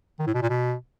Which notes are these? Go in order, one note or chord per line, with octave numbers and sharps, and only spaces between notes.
D#3
A2
B2
A#2
B2